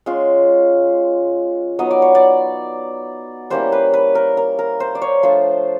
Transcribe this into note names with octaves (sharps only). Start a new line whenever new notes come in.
G#3 C#4 F4
F#3 B3 D#4 D#5
D5
C#5
D5
G3 A#3 C#4 E4 C5
B4
B4
A#4
A#4
A#4
C5
D5
C#5
F3 A3 D4 F4 C5